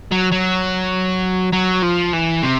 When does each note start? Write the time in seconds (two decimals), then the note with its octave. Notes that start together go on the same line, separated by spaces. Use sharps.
0.12 F#3
0.32 F#3
1.53 F#3
1.83 F3
2.13 E3
2.43 C3